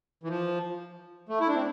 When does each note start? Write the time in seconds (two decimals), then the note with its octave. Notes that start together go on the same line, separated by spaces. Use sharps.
0.24 E3
0.29 F3
1.29 A3
1.41 E4
1.48 D4
1.55 C4